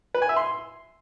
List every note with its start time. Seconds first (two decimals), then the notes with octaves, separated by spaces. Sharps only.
0.14 B4
0.22 G#5
0.29 E5
0.36 C6